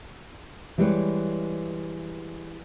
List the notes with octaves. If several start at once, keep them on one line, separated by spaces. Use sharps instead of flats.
E3 G3 G#3 A4 B4 C#5